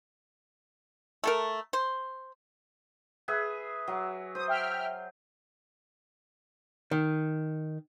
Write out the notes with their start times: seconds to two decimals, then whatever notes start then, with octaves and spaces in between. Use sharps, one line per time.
1.24 A3 A4 A#4
1.73 C5
3.28 G#4 B4 E5
3.88 F#3
4.35 C5 D#6
4.47 E5 G5 F6
6.91 D#3